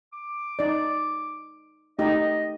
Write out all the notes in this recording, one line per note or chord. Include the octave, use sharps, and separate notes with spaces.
D6
D#4 D5
A3 D#4 G4 D#5